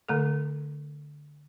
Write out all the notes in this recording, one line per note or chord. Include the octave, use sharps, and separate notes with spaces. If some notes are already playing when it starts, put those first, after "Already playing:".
D3 A3 A4